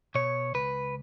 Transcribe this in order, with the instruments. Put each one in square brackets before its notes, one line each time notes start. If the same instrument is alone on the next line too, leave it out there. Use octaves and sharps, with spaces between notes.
[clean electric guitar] B2 C#5
C#2 B4